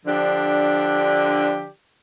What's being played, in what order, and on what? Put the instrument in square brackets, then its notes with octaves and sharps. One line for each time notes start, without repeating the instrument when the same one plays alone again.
[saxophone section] D3 F3 D4 G4